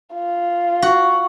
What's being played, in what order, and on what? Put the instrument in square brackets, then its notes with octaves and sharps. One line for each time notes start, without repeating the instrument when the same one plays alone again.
[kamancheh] F4
[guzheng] F#4